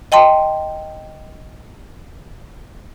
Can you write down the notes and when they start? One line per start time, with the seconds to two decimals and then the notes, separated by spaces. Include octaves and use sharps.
0.12 D#5 G5 A5 C6